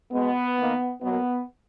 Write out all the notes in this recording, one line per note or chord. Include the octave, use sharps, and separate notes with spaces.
B2 G#3 B3
D#3 A#3
B2 F#3 A#3 B3